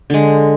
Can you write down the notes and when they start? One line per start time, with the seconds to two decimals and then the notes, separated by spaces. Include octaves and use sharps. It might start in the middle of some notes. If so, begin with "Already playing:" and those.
0.10 D3 G#3